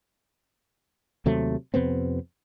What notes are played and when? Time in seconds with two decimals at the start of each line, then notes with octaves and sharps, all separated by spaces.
1.26 D#2 C3 F#3 A3
1.74 F2 C3 B3 C4